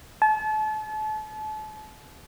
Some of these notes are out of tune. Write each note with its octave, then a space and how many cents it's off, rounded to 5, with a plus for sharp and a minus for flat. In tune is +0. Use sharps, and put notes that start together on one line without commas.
A5 -35